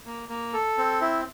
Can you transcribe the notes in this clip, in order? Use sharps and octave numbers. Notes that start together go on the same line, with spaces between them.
A#3
A#3
A4
C4
E4